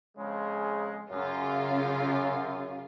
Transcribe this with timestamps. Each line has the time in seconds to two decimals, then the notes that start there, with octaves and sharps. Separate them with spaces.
0.16 F2 C#3 G#3
1.10 F#2 C#3 F4